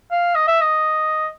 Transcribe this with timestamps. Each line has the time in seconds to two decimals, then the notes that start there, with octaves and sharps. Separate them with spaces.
0.11 F5
0.35 D#5
0.47 E5
0.61 D#5